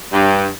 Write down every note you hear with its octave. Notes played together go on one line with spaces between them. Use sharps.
G2